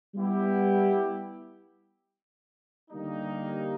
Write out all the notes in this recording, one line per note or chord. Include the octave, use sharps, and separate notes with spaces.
G3 B3 E4 G4
D3 G3 A#3 D#4